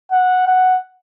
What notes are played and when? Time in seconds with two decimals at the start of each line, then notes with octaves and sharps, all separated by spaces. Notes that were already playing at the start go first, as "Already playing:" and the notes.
0.12 F#5
0.47 F#5